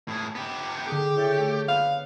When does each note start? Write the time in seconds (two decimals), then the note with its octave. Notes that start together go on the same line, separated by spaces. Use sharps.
0.08 A2 G#4
0.35 B3 G4
0.87 D3 G4 G#4
1.17 E4 C#5 A6
1.40 A3
1.68 B3 F5